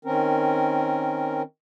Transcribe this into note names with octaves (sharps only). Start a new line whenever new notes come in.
D#3 C4 C#4 A#4